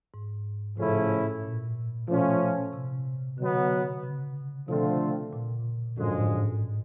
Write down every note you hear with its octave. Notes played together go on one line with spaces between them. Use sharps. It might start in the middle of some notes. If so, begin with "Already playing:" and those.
G#2
A2 C#3 F3 A3 C#4 E4
A#2
B2 F3 A3 C#4 F4
C3
B2 D3 F#3 B3
C#3
B2 D3 F3 A3 C4 F4
A#2
F#2 A2 D3 F3 G#3
G#2
A2